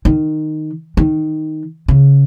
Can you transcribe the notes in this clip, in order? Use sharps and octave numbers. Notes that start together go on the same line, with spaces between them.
D#3
D#3
C#3